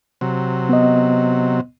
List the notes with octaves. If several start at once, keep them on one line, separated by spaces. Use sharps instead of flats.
C3 F#3
B3 D#5